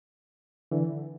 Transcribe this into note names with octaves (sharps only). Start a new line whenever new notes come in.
D3 E3